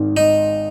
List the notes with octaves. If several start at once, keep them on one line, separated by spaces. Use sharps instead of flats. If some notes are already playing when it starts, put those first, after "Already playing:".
Already playing: G#1 G#2 D#3
D#4